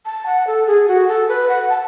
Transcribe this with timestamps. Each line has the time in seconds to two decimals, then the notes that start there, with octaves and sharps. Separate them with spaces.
0.05 A5
0.26 F#5
0.47 A4
0.67 G#4
0.88 F#4
1.08 A4
1.29 B4
1.49 F#5
1.70 A5